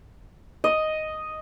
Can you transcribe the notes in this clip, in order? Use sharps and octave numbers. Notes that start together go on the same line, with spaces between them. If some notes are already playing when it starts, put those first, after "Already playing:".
D#5